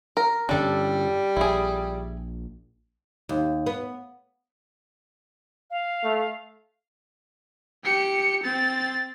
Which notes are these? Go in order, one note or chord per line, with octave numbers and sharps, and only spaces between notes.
A#4
G2 D3 G3 C#4 D4 A4
A#1 E4 G#4
D#2
B3
F5
A3
G4 C#7
C4 A6